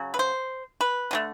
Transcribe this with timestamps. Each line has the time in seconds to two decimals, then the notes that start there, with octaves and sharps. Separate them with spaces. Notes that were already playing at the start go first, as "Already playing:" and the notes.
Already playing: C#3 F#3
0.14 B4
0.19 C5
0.81 B4
1.11 D3 F#3 A3